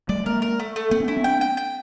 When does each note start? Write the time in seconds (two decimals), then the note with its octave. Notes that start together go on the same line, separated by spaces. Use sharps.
0.09 G3 A3 D5
0.26 G#3 A#3 A#4
0.42 A#4
0.60 A3
0.76 A3
0.91 A3 A#3 C4
1.00 B3 C#4
1.08 C4 D4 E4
1.17 B3 C#4
1.24 C4 D4 G5
1.41 G5
1.57 G5